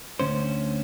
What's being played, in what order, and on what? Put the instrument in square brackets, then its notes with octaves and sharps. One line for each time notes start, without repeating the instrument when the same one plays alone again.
[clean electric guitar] D2 C#4 C5